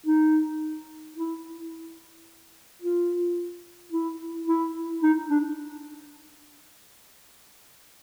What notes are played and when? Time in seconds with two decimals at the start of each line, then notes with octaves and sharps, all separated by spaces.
0.06 D#4
1.17 E4
2.82 F4
3.92 E4
4.47 E4
5.03 D#4
5.30 D4